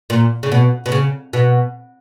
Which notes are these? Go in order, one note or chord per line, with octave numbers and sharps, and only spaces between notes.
A#2
C#3
B2
B2
C#3
B2